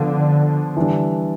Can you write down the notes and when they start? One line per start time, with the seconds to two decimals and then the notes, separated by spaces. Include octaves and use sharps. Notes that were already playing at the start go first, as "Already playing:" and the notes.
Already playing: D3 F3 B3 D4
0.77 E3 G3 D4